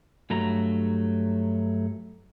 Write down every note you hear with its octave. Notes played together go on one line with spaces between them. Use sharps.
G2 F#3 A3 A#5